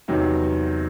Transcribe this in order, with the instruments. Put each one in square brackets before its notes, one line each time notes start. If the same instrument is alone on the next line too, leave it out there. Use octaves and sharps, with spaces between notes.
[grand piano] E2 C3 D#3 F#3